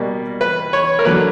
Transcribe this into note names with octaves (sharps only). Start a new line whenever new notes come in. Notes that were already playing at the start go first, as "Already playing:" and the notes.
Already playing: B2 G3 A#3
B4
C#5
A#4
D3 F#3 A#3 B4